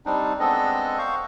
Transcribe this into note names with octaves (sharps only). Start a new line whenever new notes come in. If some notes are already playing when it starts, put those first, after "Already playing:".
G3 C4 D4 D#4
G#3 B3 C4 D4 A4 D#5
C5 F5 C#6